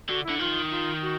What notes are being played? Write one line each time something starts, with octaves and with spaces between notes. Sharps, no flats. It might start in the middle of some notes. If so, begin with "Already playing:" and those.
D3 F#4
E4
D3
D#3 F4
F4
F#4